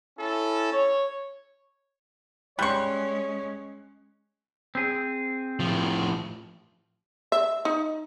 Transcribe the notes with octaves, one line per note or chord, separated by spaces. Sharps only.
C#4 E4 A4
C#5
G3 G#3 C#4 C#5 C6 C#6 F#6
C4 G#4
A2 F3
E5
D#4